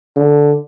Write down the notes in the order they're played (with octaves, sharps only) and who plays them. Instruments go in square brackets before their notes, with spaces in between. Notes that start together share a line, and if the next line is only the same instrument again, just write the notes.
[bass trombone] D3